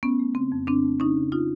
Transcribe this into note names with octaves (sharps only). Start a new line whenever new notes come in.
A3 B3 C#4
A3
C#3 C4
F2
C#3 C4 D4
A3
C#3 C#4 D#4
C#3
D#4 F4